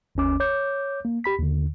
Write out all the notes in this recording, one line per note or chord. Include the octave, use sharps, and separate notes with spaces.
G1 D#2 C#4 D6
C#5 D6 G6
A#3
G4 B5 B6
D#2 D3